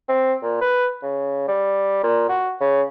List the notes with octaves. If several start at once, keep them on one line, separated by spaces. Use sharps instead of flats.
C4
A#2
B4
C#3
G3
A#2
F#4
C#3